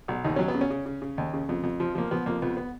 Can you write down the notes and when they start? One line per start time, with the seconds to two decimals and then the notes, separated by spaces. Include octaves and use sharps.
0.08 B1
0.25 D#2 D#4
0.36 F#3 C#4
0.48 B3
0.54 C#3
0.61 C#4
0.70 C#3
0.86 C#3
1.02 C#3
1.18 D#2
1.33 C#3
1.49 F2
1.63 F2
1.80 F3
1.95 F3 A#3
2.11 F3 B3
2.26 F2 A#3
2.42 F2 B3
2.57 B3